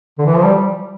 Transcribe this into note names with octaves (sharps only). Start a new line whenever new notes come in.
D3
E3
F3
G3